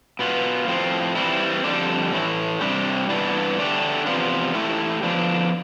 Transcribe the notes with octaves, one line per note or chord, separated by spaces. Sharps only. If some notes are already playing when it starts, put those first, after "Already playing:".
B2 B3 F4
A2 F3 C4
E3 G3 C4 E4
F2 D3 G3 D4
A2 E3 A3
C3 G3 D4 G4
G2 E3 B3 D4
D3 A3 D4 G4
E2 C3 F3 B3 F4
E3 A3 E4 G4
D3 F3 B3 D4